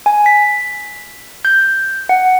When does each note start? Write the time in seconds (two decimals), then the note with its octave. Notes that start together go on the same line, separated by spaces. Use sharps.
0.06 G#5
0.26 B6
1.45 G6
2.09 F#5